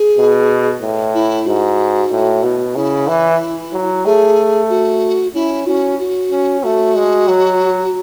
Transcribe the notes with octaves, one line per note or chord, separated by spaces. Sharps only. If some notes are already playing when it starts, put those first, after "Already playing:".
Already playing: G#4
B2
A2
E4
G#2 F#4
A2
B2
C#3 E4
E3
F#3
A3 G#4
F#4
C#4 E4
C#4 F#4
F#4
C#4
A3 F#4
G#3
F#3